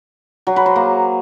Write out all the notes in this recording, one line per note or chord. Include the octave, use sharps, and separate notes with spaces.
F#3
B4
C5
A#3